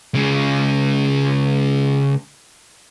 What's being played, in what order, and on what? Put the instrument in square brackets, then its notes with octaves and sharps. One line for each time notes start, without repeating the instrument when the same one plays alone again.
[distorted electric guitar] C#3 G#3